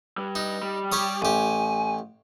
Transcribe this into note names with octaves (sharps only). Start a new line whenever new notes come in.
G2 G3
D#4
G3
G4 C#5 D#6
A1 G4 G#5